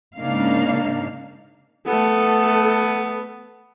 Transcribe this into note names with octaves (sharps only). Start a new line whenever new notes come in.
G#2 C#3 A#3 D4 D#4 F5
A3 B3 A4